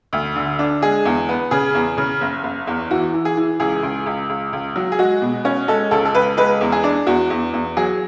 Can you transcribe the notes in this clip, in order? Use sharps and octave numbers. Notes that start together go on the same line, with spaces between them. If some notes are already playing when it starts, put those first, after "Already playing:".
D2
D3
D4
G#3 G#4
E2
B3
C#3 G#4
E2
C#3
F#1
F#1
E2
E3 F#4
E3
G#4
E3
C#2 G#4
C#2
C#2
C#2
C#2
F#3
G#4
G#3 F#4
B2
C#4
G#3 A4
C#2 A4
A4
C#2 B4
G#3 B4
E2
G#4
D4
E2 F#4
E2
E2
F#3 G#4